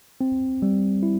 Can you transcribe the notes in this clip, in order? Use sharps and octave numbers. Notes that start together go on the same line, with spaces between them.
C4
G3
E4